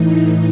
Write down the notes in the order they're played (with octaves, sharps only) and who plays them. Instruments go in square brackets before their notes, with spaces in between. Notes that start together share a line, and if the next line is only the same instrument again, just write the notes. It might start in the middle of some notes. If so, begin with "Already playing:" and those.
Already playing: [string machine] A2 E3 D#4